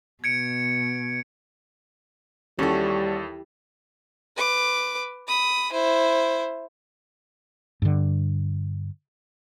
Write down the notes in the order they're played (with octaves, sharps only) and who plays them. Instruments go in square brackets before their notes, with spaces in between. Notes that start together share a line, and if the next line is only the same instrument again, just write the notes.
[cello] B2 [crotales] G#6 C#7 D7
[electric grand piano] D#2 A4 [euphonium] G3 [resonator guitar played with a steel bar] C#4 F#4 [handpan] E4 G4
[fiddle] B4 D6
B5 D#6
E4 C5
[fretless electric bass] G2 D3